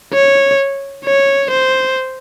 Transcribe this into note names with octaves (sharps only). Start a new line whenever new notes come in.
C#5
C#5
C5